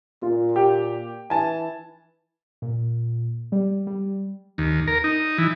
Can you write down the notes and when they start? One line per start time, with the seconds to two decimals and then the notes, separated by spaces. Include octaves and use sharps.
0.23 A#2 F4
0.56 G4
1.30 E3 G#5 A5
2.62 A#2
3.52 G3
3.87 G3
4.58 D#2
4.87 A#4
5.04 D#4
5.38 E3